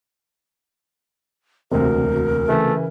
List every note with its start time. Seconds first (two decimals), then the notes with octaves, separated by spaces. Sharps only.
1.72 E1 D2 C3 C4 F#4 A#4
2.48 C#3 E3 A3